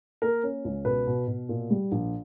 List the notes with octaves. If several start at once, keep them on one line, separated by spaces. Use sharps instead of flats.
A#3 A#4
C#4
C#2
B2 B4
B2
B2
A#2
G3
A#1